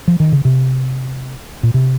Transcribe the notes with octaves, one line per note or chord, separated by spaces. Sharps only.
F3
D#3
C#3
C3
A#2
C3